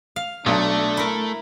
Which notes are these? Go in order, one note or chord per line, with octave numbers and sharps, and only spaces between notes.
F5
B1 A3 D4
E4 A#4